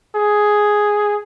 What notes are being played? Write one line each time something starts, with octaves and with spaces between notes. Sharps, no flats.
G#4